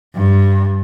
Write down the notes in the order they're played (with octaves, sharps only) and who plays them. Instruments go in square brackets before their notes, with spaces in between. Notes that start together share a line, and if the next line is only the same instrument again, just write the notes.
[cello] G2